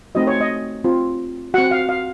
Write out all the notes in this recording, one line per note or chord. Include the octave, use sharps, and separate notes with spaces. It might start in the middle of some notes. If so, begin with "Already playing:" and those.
A3 C4 D#4 F#4 D#5
C#5
D#5
C4 F4
C4 F#4 F#5
F5
F5